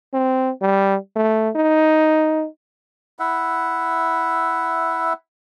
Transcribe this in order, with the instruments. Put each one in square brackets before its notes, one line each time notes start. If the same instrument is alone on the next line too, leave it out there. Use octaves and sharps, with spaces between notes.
[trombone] C4
G3
A3
D#4
[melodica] E4 E5 F#5